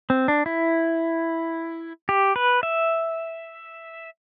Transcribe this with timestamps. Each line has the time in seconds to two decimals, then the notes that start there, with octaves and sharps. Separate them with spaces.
0.10 C4
0.28 D4
0.46 E4
2.09 G4
2.36 B4
2.63 E5